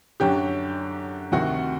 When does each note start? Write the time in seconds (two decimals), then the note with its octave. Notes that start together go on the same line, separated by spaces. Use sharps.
0.20 F#2 D3 F#3 G4 G5
1.32 D2 C3 D#3 F#4 F#5